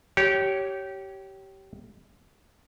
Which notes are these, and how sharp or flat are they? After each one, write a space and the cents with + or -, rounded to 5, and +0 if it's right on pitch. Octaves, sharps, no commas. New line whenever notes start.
G4 -20 C#5 +0